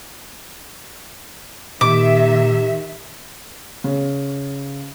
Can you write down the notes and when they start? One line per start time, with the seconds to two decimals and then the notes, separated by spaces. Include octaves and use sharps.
1.81 A#2 D#3 G4 E5 D6
3.84 C#3